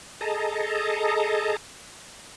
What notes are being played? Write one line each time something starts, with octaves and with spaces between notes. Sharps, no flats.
G#4 A4 D#5 A5 A#5